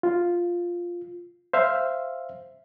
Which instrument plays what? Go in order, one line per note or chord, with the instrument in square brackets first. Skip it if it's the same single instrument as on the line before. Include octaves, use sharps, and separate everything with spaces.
[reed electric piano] F4
C5 E5 F5